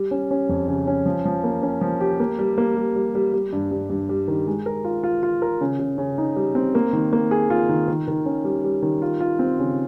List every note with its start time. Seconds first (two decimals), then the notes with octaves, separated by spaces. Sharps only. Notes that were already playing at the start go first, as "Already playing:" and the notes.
Already playing: G3
0.11 C#4
0.31 C#4
0.49 F2
0.68 C#3
0.87 C#4
1.06 F3
1.25 F3
1.44 A#3
1.63 C#4
1.81 F3
2.01 G4
2.20 A#3
2.39 G3
2.58 A#3
2.76 G3
2.96 G3
3.15 G3
3.33 G3
3.53 G2
3.71 G2
3.90 G2
4.09 G3
4.28 D#3
4.47 G#3
4.66 A#4
4.85 F4
5.04 F4
5.23 F4
5.42 A#4
5.61 C#3
5.79 C#3
5.98 C#3
6.18 D#4
6.36 G3
6.55 C4
6.75 A#3
6.93 D#3
7.13 A#3
7.31 G#4
7.50 F4
7.69 D#3
7.88 D#3
8.08 D#3
8.26 C#4
8.45 G3
8.64 G3
8.82 D#3
9.02 F4
9.21 F4
9.39 C4
9.59 C#3